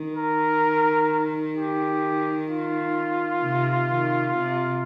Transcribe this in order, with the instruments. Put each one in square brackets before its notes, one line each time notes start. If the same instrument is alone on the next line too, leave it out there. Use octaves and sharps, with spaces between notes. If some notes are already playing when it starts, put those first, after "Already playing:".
Already playing: [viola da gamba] D#3
[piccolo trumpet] A#4
G4
F4
[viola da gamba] C3
D#3
C3